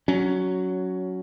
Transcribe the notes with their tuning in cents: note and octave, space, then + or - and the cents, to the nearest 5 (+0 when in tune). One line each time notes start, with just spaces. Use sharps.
F#3 +0 C#4 +15